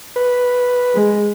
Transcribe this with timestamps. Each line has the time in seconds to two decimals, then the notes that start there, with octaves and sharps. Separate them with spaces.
0.16 B4
0.95 G#3